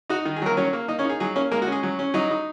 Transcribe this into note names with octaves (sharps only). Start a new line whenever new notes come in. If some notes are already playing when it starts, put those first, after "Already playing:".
D#4 F#4
D#3
G#4
F#3 A#3 A#4
F#3 C#4 C#5
A#3
A#3 D#4 D#5
C#4 C#5
D#4 G#4
F#3 G#4
A#3 C#4 C#5
G#3 A#3 A#4
F#4
C#4 G#4
F#3
C#4
F#3 D#4 D#5
D#4